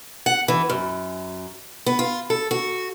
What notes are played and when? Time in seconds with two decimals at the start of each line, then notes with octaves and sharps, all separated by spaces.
0.26 F#5
0.48 E3
0.69 F#2
1.86 B3
1.99 F4
2.30 A4
2.51 F#4